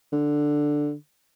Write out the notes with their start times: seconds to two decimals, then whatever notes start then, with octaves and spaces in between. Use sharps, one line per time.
0.13 D3